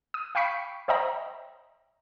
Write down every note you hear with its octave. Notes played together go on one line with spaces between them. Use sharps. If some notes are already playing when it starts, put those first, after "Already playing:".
D#6
F5 G5 B5 C#6 B6 C#7
C5 C#5 D#5 E5 G5 A#5